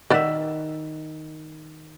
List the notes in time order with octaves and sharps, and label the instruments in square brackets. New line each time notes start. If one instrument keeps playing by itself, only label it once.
[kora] D#3 E5 [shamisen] A#4 D5 F#5